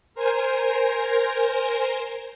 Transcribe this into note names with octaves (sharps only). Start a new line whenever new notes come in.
A#4 C5 G#5